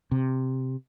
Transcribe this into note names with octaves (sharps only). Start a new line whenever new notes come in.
C3